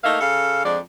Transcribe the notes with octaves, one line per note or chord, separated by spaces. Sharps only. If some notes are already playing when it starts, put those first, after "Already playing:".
A3 A#3 D#4 E5 F5
C#3 A4 F5
F2 F3 G#3 D4 D5